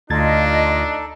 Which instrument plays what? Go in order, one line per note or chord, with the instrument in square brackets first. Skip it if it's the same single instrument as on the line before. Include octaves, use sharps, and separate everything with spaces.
[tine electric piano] D2 G#6 A6 [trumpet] D4 [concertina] D#4 A4 [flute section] F4 D#5